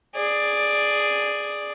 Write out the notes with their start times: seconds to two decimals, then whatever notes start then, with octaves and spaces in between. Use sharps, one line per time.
0.16 G#4 D5